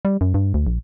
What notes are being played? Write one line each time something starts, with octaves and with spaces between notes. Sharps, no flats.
G3
F#2
G2
D2
A#1